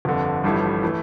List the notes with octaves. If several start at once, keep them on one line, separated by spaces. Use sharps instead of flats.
G1 F2 D3
A1 G2 F3 A3 E4
E3 A3